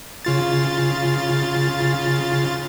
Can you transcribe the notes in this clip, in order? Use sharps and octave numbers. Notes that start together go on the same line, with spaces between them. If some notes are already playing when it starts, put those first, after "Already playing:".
C#3 F4 A6